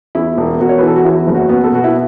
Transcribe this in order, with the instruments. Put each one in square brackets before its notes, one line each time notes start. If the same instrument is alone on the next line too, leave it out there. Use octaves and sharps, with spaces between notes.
[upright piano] E2 E4
E1
E1 F#4
C#5
B4
E3 A4
F#4
E2 E4
F#1
F#4
B3
A4
B2 F#4
E4